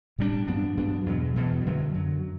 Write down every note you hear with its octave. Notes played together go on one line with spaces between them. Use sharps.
A2 G3 B3 D4
G2 F#3 B3 D4
G2 F#3 B3 D4
E2 B2 F#3
E2 B2 F#3
F#2 D3 F#3
F#2 D3 F#3